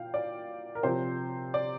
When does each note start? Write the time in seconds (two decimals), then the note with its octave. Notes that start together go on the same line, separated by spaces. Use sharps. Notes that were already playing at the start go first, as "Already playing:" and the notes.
Already playing: A#2 F5 G5
0.14 D5
0.75 A#4
0.83 C3 F3 C5
1.54 D5